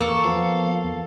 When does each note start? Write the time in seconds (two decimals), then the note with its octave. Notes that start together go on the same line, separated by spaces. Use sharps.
0.01 E2 A#3 A4 C#6
0.25 F3 B3 F5
0.84 E2